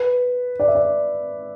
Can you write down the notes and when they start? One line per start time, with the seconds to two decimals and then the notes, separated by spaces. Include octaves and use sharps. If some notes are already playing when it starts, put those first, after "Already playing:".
Already playing: B4
0.60 D5
0.68 E5
0.75 D5